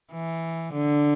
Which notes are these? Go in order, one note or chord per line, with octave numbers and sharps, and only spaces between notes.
E3
D3